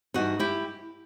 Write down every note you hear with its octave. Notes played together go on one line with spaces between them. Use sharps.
G2 E3 G3 D#4 F#4
E4 G4